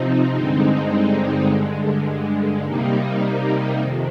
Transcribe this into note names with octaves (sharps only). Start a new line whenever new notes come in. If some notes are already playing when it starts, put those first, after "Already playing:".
Already playing: C3 F3 C4 D#4
G2 D3 G#3 C4 D#4
G2 D3 G#3
C3 G3 A#3 D#4
F2 C3 D#3